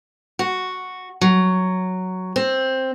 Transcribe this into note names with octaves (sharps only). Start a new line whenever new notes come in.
F#4
F#3
C4